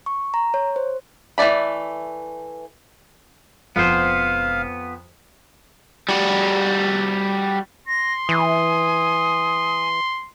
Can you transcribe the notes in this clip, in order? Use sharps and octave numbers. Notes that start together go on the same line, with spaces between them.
C#6
A#5
C#5
C5
E3 A3 E4 D5 B5
E1 F2 B3 C5 F5
G3 F#4
C6 A#6
E3 G#5 D#6